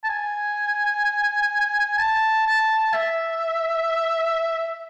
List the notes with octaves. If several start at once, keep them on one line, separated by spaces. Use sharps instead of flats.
A5
G#5
A5
A5
E5